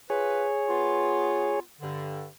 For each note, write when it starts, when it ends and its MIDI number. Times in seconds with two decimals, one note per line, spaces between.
0.10 0.47 65
0.10 1.60 68
0.10 0.47 71
0.10 1.60 73
0.68 1.59 59
0.68 1.59 65
1.81 2.25 43
1.81 2.25 50